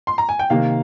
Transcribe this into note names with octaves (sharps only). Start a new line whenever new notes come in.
C6
A#5
G#5
G5
C3 D#3 A#3 F5